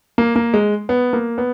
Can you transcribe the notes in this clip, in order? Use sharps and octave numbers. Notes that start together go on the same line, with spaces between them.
A#3
A#3
G#3
B3
A#3
B3